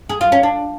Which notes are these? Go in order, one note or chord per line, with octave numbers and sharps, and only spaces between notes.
G#4
F4
C#4
D4